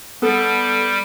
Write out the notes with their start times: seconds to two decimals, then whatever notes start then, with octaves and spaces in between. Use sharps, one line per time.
0.22 G3 B3 A4